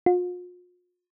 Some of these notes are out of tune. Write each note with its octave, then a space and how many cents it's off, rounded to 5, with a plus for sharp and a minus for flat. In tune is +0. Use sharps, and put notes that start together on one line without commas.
F4 +40